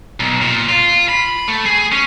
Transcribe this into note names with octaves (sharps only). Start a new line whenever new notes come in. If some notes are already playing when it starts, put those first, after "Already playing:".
B1
A#2
F4
B5
A3
G#4
C#4